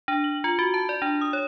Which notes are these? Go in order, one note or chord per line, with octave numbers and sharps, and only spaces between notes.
D4
F#7
F4
F#4
A5
D5
D4
D#6
C#5